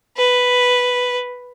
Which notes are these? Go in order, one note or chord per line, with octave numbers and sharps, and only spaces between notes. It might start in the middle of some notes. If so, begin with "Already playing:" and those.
B4